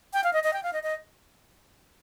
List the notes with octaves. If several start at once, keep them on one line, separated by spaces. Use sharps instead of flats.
G5
F5
D#5
D#5
G5
F5
D#5
D#5